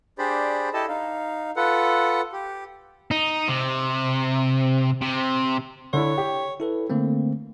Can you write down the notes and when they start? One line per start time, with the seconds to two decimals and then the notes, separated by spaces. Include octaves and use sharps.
0.18 D4 G4 G#4 C5 D5 B5
0.73 E4 G4 A4 D#5 A5
0.88 D#4 F5
1.56 F4 A4 B4 F#5
2.32 G4
3.11 D#4
3.48 C3
5.02 C3
5.93 D3 E4 C#5
6.18 G4
6.60 E4 A4 B4
6.90 D3 A3 A#3 C4